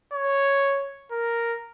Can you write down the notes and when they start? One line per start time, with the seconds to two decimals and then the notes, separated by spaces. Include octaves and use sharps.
0.13 C#5
1.11 A#4